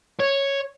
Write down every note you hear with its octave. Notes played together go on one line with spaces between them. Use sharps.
C#5